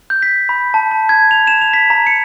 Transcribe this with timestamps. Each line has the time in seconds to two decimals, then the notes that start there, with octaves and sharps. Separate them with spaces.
0.10 G6
0.22 B6
0.49 B5
0.74 A5
0.91 A5
1.09 G#6
1.31 F7
1.47 E7
1.62 F7
1.73 B6
1.90 A#5
2.07 C#7